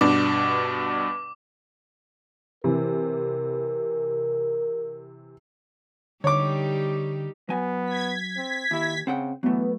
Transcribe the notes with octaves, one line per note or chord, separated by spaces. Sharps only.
G2 B2 D4 D6
C3 E3 A#4
D3 G3 D#4 G4 C#5 D6
F#3 B3 G#5
G#6 B6
C4
D#2 E4
C#3 C4 F#5 G5
E3 F#3 A3 B3